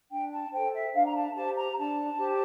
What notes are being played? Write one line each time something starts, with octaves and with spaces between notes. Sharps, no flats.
D4 G5
A5
A4 C5 G5
E5
D4 F5
A#5
A5
G4 C5 A5
A#5
D4 A5
G4 C5